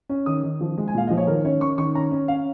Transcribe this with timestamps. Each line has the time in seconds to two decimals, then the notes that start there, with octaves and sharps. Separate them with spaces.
0.09 C#4
0.26 D#3 D#6
0.43 D#3
0.61 F3
0.78 G#3
0.88 G#5
0.95 A#2 F5
1.07 F3 D#5
1.17 C#5
1.27 D#3 A#4
1.45 C#4 C#5
1.61 C#4 C#6
1.78 D#3 C#6
1.95 C#4 A#5
2.11 C#4
2.28 C#4 F5